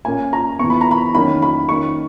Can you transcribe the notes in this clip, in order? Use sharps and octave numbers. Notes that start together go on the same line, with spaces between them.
A#2 A#3 C#4 G#5
A#5
E3 B3 C#6
B5
A#5
B5
D#3 F#3 A#3 C#4 B5
B5
D#3 A#3 C#4 C#6